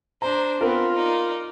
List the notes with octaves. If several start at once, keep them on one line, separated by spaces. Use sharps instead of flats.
D4 C5 A#5
B3 C4 F4 A#4
D#4 D5